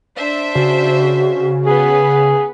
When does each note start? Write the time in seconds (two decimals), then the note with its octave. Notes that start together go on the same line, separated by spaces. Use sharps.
0.16 D4 C5 E5
0.55 C#3 F#4
1.66 B3 G#4 B4